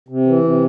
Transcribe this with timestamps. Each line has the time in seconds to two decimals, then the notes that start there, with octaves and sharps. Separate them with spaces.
0.09 C3
0.27 E3
0.43 C3